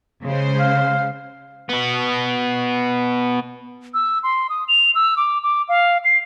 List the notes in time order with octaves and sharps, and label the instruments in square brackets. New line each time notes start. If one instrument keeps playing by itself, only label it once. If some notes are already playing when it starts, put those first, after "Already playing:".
[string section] C#3 G#3 C5
[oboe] F5
[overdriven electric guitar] B2 B3
[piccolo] E6
C6
D#6
F7
E6
D6
D6
F5
C7